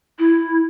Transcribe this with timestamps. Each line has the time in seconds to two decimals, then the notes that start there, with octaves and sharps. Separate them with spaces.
0.19 E4